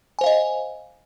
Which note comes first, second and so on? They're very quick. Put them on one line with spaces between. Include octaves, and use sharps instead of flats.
G#5 C5 F5 D#5